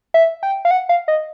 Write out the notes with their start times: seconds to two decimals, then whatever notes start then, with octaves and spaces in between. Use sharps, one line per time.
0.14 E5
0.43 G5
0.65 F5
0.71 F#5
0.89 F5
1.08 D#5